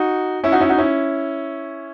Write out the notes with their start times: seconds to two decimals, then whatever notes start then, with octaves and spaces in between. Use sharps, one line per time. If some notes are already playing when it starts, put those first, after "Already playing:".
Already playing: D#4 F#4
0.44 C#4 E4
0.52 D#4 F#4
0.61 C#4 E4
0.69 D#4 F#4
0.78 C#4 E4